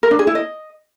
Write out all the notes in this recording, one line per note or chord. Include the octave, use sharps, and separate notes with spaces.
A#4
D4
G#4
E4
D#5